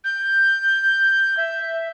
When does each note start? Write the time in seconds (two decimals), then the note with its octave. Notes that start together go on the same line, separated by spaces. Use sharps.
0.04 G6
1.37 E5